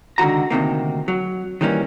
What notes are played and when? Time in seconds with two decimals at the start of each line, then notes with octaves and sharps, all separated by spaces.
0.18 C#2 D3 D#3 F#4 A#5
0.50 D2 C3 D#3 A#3
1.08 F#3
1.61 D#3 E3 G3 A#3 C#4